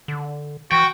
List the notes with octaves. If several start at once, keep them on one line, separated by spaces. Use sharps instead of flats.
D3
E3 F#4 G5 C#6